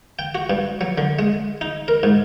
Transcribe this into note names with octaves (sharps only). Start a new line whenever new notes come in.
G5
F#4
G2
F#3
D3
G#3
D#4
A#4
G#2